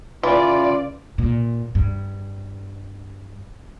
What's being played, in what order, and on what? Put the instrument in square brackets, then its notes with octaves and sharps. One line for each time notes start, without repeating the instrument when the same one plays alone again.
[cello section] C#3 D5 [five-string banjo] E3 [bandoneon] F4
[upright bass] A#2
G2